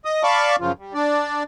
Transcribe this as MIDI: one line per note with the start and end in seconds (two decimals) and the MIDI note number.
0.05 0.23 75
0.05 0.23 87
0.23 0.56 74
0.23 0.56 77
0.23 0.56 81
0.23 0.56 83
0.23 0.56 85
0.23 0.56 86
0.60 0.72 42
0.60 0.72 49
0.60 0.72 53
0.60 0.72 65
0.78 0.93 55
0.94 1.43 62
0.94 1.43 74